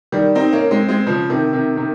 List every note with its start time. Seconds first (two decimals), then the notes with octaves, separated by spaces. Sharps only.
0.12 D#3 G3
0.35 C4 D#4
0.53 A#3 C#4
0.71 G#3 C4
0.89 G#3 C4
1.07 C#3 F3
1.29 C3 D#3
1.53 C3 D#3
1.77 C3 D#3